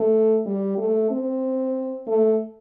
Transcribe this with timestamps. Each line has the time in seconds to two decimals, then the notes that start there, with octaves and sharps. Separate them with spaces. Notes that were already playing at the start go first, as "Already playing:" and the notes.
Already playing: A3
0.46 G3
0.78 A3
1.10 C4
2.07 A3